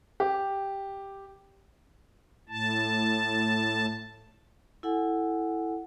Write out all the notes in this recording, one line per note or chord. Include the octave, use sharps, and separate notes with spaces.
G4
A2 A5
E4 A4 F#5 G#5